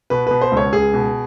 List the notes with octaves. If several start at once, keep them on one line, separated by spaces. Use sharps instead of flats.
B2 B4
B2 B4
C5
C#2
C#5
C#2 G#4
B2